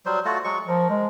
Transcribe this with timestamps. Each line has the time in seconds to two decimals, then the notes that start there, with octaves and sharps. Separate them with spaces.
0.06 F#3 G3 C5
0.25 A3 F4 F#4
0.44 F#3 G#3 C#6
0.67 F3 A#4
0.90 G#3